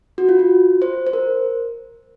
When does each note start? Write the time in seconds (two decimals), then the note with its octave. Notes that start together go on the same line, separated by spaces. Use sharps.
0.18 F#4
0.29 F4
0.39 F#4
0.82 C5
1.07 C5
1.13 A#4